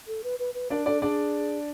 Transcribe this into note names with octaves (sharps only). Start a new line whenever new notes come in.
A4
B4
B4
B4
D4 A#4 D5
D4 A4 D5
D4 G#4 D5